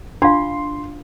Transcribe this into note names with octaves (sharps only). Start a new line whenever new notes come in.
D4 F4 F5 C6